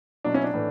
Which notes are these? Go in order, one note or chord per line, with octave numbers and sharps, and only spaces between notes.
B2 F#3 D4
C#4 E4
D4
A2 E3